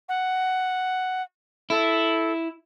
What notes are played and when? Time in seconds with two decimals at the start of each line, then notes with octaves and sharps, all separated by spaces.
0.09 F#5
1.70 E4 A4